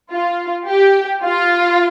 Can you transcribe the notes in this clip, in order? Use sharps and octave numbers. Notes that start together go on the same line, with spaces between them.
F4
G4
F4